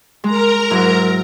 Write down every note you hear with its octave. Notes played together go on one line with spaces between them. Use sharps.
G#3 A#4 A#5
G#2 F#3 E4